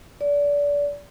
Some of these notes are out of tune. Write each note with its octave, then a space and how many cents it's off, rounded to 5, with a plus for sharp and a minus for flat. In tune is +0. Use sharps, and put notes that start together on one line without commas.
D5 -25